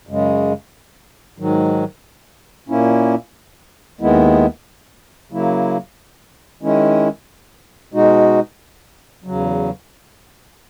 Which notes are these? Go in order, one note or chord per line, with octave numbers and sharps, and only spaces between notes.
F#2 C#3 G#3
G#2 D#3 F#3
A#2 A#3 C#4 E4
D#2 D#3 G#3 B3 E4
C#3 F#3 A#3 E4
D#3 G#3 C#4 E4
B2 G#3 D#4 F#4
E2 C#3 F#3